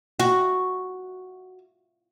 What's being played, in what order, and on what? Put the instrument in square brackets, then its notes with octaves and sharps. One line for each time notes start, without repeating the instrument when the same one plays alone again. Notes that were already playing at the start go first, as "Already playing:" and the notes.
[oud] F#4